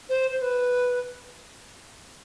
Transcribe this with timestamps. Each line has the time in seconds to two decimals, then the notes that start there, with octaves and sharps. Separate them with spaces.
0.09 C5
0.30 C5
0.41 B4